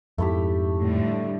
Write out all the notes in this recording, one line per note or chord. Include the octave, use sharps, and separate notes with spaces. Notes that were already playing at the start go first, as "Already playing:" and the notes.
F2 G#2 A3 E4 G4
A2 D3 G3